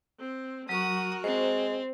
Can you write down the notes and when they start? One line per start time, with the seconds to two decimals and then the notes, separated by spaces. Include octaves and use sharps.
0.19 C4
0.69 F#3 F#4 A#4 C#6 D#6
1.24 G#3 C4 C5